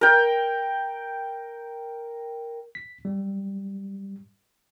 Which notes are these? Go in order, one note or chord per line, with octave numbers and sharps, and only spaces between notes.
A#4 G5
B6
G3